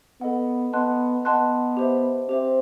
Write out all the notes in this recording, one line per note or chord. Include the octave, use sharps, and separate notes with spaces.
B3 A4 D#5 F#5
B3 D#5 F#5 A5 C6 F#6
B3 D#5 F#5 A5 C6 F#6
G4 C5 E5
C4 G4 C5 E5